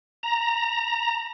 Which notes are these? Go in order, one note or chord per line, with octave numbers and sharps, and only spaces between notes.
A#5